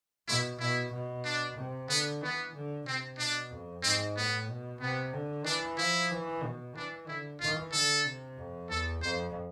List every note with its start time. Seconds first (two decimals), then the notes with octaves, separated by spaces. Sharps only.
0.27 B2 E4
0.60 B2 E4
0.92 B2
1.24 D4
1.57 C3
1.89 D3 B3
2.21 E3 B3
2.54 D3
2.87 C3 C4
3.18 B2 D4
3.51 F2
3.83 G#2 C4
4.16 A2 B3
4.48 B2
4.80 C3 B3
5.13 D3
5.45 E3 D4
5.78 F3 E4
6.11 E3
6.43 B2
6.75 E3 D4
7.07 D3 E4
7.40 E3 F4
7.72 D3 A4
8.05 C3
8.37 F2
8.70 E2 A4
9.02 F2 C5